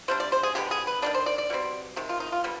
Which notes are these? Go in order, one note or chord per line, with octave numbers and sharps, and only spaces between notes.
C3 G3 D4 C5
D5
C5
G#4
D3 G#3 B3 G4
G#4
B4
D#3 B3 D4 D5
C5
D5
D5
B2 G3 C4
C3 D#3 G#3
F4
D#4
F4
D3 G3 B3